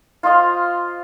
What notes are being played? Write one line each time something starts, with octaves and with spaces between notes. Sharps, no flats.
F4 C5 D#5 F5